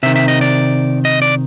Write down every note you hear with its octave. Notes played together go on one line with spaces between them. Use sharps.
C3 D#3 E5
E5
D#5
D5
D#5
D5